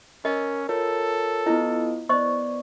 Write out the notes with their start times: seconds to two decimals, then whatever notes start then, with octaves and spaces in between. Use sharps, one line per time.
0.25 C#4 A#4 D#5
0.69 F4 A4 A#4 C#5
1.46 B3 E4 F4 D#5
2.09 B3 C5 D5 D#5 C#6